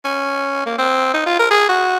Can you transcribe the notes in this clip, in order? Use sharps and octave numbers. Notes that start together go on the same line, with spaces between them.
C#4
A#3
C4
D#4
F4
A#4
G#4
F#4